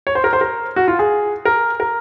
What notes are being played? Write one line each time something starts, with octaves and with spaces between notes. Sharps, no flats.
C#5
C5
A#4
C5
A#4
F#4
F4
G#4
A#4
A#4